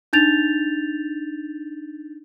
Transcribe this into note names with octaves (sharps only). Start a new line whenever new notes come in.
D4 D#4 G6 A6 F7